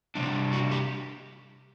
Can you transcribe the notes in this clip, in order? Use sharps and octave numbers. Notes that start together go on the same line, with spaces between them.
C3 G3 D4
F#4
G4